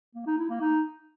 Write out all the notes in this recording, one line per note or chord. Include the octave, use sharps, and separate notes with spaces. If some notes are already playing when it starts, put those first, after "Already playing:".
A#3
D#4
E4
A#3
D#4